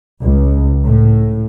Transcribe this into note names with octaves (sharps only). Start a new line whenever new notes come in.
C#2
A2